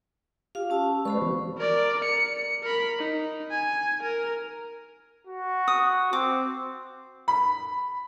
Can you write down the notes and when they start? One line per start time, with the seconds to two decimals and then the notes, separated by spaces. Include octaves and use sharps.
0.55 F4 G4 F5
0.70 C#4 A5 E6
1.05 G#3 B4 C5 D5 B5 C#6
1.22 E3 B3 F#4
1.58 A#4 D5
2.05 C#7
2.63 A#4 B5
2.98 D#4
3.51 G#5
4.03 A#4
5.27 F#4
5.68 D#6
6.13 C4 D6
7.28 B5